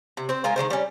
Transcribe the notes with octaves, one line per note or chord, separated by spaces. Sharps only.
C3
C4 C5
G#3 F4 A#4 G#5
D#3 F#3 G#3 C5
G3 C#4